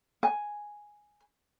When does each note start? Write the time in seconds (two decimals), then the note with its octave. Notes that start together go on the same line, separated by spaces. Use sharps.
0.23 G#5